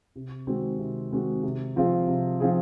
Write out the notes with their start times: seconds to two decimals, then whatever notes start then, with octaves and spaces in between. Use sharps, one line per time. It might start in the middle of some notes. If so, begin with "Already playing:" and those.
0.16 C3
0.47 D#3 G#3 C4 F#4
0.79 C3
1.11 D#3 G#3 C4 F#4
1.43 C3
1.76 F3 C4 F4 G#4
2.07 C3
2.40 F3 C4 F4 G#4